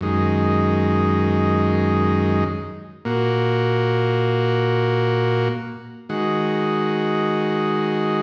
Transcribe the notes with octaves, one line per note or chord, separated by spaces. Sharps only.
F#2 D#3 G#3
A#2 A#3 F#4
D#3 G#3 F#4